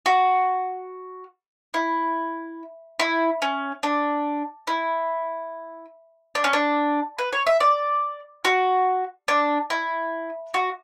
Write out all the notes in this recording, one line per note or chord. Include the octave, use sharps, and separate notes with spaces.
F#4
E4
E4
C#4
D4
E4
D4
C#4
D4
B4
C#5
E5
D5
F#4
D4
E4
F#4